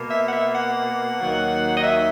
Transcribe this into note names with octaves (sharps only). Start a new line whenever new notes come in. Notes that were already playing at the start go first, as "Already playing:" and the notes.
Already playing: B2 A#3
E5
F#5
E5
F#5
D#2 D#3 F#3 A#3
D#5
E5